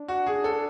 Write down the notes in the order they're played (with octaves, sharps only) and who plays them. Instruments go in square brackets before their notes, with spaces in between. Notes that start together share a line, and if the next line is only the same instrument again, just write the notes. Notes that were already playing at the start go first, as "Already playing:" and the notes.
Already playing: [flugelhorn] D4
[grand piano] F#4
G#4
A4